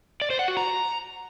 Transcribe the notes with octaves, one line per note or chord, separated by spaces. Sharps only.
D5
C5
F#5
F#4
A#5